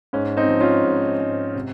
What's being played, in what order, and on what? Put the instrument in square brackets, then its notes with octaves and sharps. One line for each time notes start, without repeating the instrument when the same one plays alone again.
[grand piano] G#2 C#4
C4 D#4
F3
C#4 F4
G#2
G#2
C3